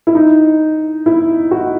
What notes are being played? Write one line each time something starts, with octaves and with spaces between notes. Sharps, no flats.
E4
D#4
E4
F#4